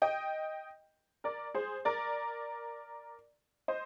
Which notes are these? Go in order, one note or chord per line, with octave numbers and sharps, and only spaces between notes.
D#5 G5
A#4 D5
G#4 C5
A#4 D5
C5 D#5